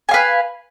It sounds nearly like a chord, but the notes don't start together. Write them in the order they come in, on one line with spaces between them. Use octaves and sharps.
G#5 F5 B4